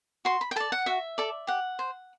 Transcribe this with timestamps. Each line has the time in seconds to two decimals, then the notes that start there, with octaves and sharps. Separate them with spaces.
0.25 F#4 C6
0.41 B5
0.51 G5
0.56 A4 D5 A5
0.72 F#5
0.86 F#4 E5
1.18 A4 D5
1.47 G4 F#5
1.79 C5